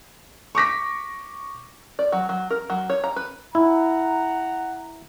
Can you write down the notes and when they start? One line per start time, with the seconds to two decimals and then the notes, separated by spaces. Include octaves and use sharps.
0.55 C#6 D6 A#6 B6
1.99 D5
2.12 F#3
2.29 F#3
2.50 A#4
2.70 F#3
2.90 C#5
3.04 A#5
3.16 B4
3.55 E4 F#5 A#5